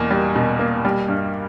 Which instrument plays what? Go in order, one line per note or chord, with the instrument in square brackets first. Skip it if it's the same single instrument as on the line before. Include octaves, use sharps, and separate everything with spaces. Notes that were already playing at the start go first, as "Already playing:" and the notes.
Already playing: [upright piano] E2 B2 A#3
G3
B2
A#3
G3
G2